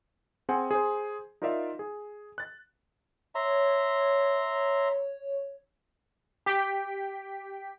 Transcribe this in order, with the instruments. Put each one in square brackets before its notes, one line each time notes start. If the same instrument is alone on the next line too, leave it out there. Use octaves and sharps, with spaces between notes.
[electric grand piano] C4 G#4 C5 F#5 G#5
G#4 C5
D#4 F4 A#4 D5 E5 F5
G#4
F#6 A6
[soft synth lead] C#5 [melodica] E5 A#5 C6
[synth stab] G4 G5 B6